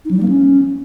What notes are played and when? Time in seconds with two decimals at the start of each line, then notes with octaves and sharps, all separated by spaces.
0.05 D#4
0.11 F#3
0.17 G3
0.23 A#3
0.28 C#4